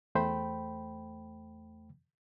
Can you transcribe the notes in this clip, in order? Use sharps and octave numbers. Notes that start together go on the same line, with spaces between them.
E2 A3 C5 G5 B5